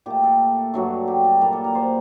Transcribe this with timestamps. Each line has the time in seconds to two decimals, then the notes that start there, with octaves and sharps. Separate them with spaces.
0.06 A#2 A3 G4
0.24 A4
0.74 G2 F#3 A3 F#4
1.08 G4
1.24 A4
1.41 A#2 G3 A#3 A#4
1.53 A4
1.64 A#4
1.75 C5